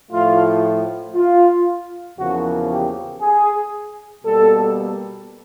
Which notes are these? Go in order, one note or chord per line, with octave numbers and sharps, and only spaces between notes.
A2 F3 A3 F4
F4
E2 C#3 F3 A#3 F#4
G4
G#4
B2 G3 A#3 A4